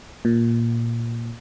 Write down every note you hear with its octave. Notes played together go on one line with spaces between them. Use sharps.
A#2